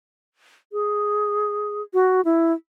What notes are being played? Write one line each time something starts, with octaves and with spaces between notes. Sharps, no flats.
G#4
F#4
E4